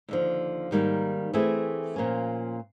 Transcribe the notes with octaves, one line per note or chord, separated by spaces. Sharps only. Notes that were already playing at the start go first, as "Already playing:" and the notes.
D#2 D3 F3
G#2 D#3 G3 A#3
E3 A3 C4 E4 G#4
A#2 F3 A#3 C#4